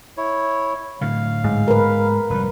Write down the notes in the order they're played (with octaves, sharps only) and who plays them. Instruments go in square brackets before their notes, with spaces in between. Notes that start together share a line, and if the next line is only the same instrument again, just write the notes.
[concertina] E4 C#5
[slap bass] A2 D3 F#3 [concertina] F5
[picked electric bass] G#2
[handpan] A#4 B4
[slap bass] F1 G3 [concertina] B4